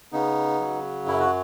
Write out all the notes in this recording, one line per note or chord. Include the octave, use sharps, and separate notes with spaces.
C#3 B3 D#4
F#3
F#2 E4
F#4